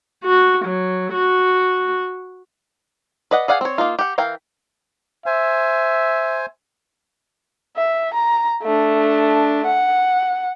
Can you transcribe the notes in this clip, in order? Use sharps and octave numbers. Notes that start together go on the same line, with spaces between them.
F#4
F#3
F#4
B4 D5 D#5 F#5
G#4 D5 F5 F#5 G#5
C4 C#5
A#3 D#4 F4
G4 F#5
E3 A#4 F5 G5
C5 E5 G#5
E5
A#5
A3 D4
F#5